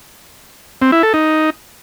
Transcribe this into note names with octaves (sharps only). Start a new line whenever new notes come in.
C4
E4
A4
D#4